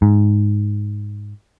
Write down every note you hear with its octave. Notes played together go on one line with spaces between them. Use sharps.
G#2